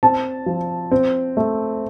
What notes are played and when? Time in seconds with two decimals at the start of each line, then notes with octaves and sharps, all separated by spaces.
0.03 C4 A5
0.46 F3
0.91 C4
1.37 A3